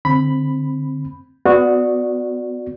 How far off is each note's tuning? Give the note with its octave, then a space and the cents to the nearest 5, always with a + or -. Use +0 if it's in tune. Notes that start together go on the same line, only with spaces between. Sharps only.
D3 +0 C4 +5 B5 +0
B3 +25 F#4 -15 D5 +0